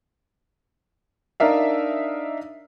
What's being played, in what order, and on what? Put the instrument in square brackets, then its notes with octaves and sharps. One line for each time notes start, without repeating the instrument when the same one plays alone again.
[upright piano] D4 D#4 A#4 E5 F5